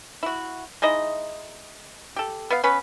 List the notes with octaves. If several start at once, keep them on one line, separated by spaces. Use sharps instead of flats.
E4 F#4
G#3 D#4 E4 D#5
G4 A4
B3 F5
B3 C#4 B4 B5